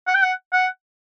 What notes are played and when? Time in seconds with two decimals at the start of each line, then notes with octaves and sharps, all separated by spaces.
0.08 F#5
0.15 G5
0.23 F#5
0.53 F#5